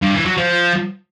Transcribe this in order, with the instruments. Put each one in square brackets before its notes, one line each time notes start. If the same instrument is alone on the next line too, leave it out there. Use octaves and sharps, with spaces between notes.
[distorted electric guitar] G2
E3
F#3
F3